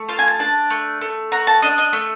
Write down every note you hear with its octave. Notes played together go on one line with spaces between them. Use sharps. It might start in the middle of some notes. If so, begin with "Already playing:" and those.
Already playing: A3
F4 A5
G#5
A5
D4 A5
A3
A3
F#4 A#5
A5
D4 D#5
D#5
A3